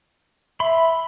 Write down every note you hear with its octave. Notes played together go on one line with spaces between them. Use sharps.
E5 B5 C6